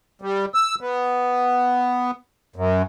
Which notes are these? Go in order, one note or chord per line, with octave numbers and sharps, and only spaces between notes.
G3
E6
B3
F#2